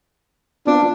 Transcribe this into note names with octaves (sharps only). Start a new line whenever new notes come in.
B3 C4 D4 F4